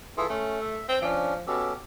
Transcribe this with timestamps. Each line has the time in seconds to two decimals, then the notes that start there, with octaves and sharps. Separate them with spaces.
0.17 E3 F4 G#4 A4
0.29 A3 C#4
0.61 E5
0.88 C4
1.02 F3 C#4 D4
1.47 B2 C#4 G4 A4